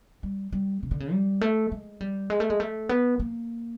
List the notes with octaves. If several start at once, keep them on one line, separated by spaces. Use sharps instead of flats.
G3
G3
C#3
D3
C#3
G3
A3
G#3
G3
G#3
A3
G#3
A3
B3
A#3